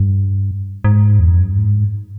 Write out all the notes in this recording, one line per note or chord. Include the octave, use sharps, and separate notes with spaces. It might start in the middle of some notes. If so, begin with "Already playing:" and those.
Already playing: G2
G#2
E2
F2
F#2
G2
G#2